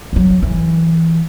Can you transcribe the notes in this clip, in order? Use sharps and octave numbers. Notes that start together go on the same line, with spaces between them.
G2 F#3
E3